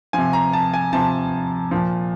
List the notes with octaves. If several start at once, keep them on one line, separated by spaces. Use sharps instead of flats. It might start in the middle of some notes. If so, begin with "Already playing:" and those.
C3 F3 G#5
A#5
A5
G#5
C3 F3 A5
A#2 F3